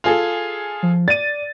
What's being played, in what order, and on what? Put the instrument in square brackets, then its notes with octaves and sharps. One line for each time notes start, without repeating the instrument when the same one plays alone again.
[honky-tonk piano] F4 G#4 A4
[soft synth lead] F3
[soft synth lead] D5 [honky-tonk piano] A6 D#7